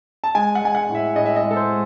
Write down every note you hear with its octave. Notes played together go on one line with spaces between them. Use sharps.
A5
G#3 G#5
F#5
G#3 G#5
F#5
A2
E5
A2 D#5
E5
D#5
G#3
A4
C5
G#3